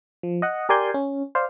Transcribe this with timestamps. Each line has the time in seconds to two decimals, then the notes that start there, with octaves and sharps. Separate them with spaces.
0.23 F3
0.42 D#5 F#5
0.69 G4 A#4 D5 G#5 C6 G6
0.94 C#4
1.35 C5 D5 F5